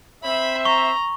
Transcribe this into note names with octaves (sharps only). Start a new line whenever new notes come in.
C4 C5 E5 B5
A#5 C#6